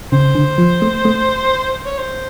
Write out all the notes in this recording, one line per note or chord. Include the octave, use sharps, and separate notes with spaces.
C#3 C5
D3
F3
A3
A3
C#5
C5